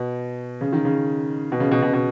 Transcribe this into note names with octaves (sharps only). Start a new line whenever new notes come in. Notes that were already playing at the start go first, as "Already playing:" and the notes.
Already playing: B2
C#3
D#3
C#3
B2
C#3
B2
B2
B2